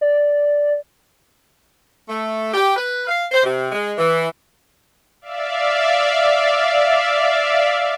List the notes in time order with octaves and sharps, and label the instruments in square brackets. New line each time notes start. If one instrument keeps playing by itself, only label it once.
[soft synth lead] D5
[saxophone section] A3
G4
B4
F5
C5
C3
G#3
E3
[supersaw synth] D5 E5 F5